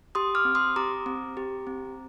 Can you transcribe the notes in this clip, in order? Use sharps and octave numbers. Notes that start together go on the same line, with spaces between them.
G4 C6 D#6
D6 F6
C4
C6 D#6
G4 A#5 D6
C4
G4
C4